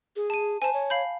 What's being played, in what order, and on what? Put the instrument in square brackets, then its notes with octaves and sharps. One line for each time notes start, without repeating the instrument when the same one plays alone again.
[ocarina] G#4
[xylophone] A5 D#7
[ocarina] C5 [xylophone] G#5 A5
[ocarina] C#5
[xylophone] F5 B5 G6